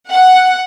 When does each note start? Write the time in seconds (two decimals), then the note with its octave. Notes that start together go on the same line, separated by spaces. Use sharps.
0.11 F#5